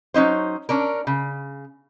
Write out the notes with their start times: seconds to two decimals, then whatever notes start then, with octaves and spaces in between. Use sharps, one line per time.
0.14 F#3 C#4 D#4 C5
0.69 C#4 D4 A#4
1.07 C#3